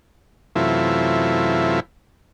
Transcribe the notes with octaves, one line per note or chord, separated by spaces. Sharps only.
F#2 C3 E3 A3 E4 F4